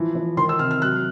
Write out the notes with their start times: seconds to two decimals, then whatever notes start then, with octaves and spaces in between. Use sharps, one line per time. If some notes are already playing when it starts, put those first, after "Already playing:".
Already playing: E3 F3
0.15 E3
0.37 D#3 C6
0.49 E6
0.59 C3 F6
0.71 F6
0.82 F#3 F#6